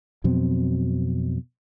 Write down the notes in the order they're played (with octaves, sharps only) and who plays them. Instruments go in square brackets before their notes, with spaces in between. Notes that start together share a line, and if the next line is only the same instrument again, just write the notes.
[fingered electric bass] F2 B2 F#3 C4